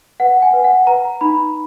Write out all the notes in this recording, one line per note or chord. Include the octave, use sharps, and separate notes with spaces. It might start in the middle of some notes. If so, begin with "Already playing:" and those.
B4 F#5
G#5
B4
F#5
B4 A#5
D#4 B5